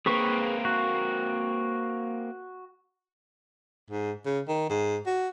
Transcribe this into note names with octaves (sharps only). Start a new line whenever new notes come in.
A#3 C4 G#4 B4 C#6
F#4
G#2
C#3
D#3
G#2
F#4